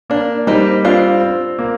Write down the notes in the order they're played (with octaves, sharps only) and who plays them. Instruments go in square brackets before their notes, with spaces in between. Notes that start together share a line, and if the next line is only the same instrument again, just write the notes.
[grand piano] A#3 [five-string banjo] D4
[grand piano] G3 [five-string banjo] C4 D#4
[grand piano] C4 [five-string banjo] D4 F4
[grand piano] C4
A#3